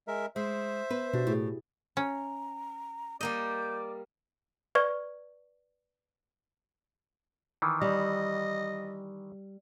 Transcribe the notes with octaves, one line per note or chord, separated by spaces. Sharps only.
G#3 A#4 E5
G#3 C5 E5
B3 B4
B2 D4 F#4 G4
A2 E4 G4 G#4
C#4 A#5
G3 A#3 D5 D#5 G6
B4 D5 C#6 G#6
D#3 E3
G3 D#5